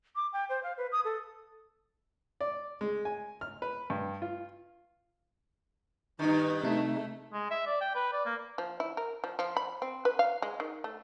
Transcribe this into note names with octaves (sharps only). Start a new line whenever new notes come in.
D6
G5
C5
F5
B4
D#6
A4
D5
G#3
G#5
F6
B4
G2
F4
G2 D#3 D#4
C3 A3 D#4
G#3
E5
D5
G5
B4
D5
A#3
F3
E4
A#4
F3
F3
B5
C4
B4
F5
G#3
D#3
A3